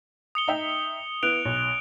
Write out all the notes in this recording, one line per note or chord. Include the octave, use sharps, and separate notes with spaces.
D#6 C#7 G7
D#4 E5 G5
B3 E4 F#6 D7 F7
B1